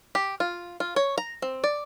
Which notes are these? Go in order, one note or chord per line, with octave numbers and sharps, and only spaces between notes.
G4
F4
F4
C#5
A#5
C4
D5